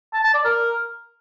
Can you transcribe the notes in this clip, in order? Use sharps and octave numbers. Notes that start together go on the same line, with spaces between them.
A5
A5
D5
A#4